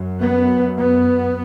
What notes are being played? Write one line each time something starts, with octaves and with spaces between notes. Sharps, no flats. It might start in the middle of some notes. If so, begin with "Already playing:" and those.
Already playing: F#2
B3
B3